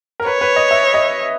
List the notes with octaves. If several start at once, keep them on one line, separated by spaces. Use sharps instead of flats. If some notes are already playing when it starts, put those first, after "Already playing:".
A#4
B4 C#5
B4
D#5
E5
D#5